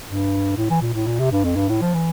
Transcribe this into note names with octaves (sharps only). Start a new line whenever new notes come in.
G2
A2
E3
A#2
A2
A#2
C3
G2
F2
G2
A2
F3
E3